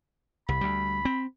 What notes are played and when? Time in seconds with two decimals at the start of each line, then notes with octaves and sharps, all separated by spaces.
0.49 C2 B5
0.61 D2 G3
1.05 C4